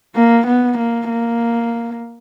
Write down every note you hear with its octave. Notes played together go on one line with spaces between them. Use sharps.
A#3
B3
A#3
A#3